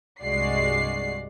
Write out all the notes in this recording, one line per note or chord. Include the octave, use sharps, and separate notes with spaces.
C2 G2 G#3 F#4 D5 C7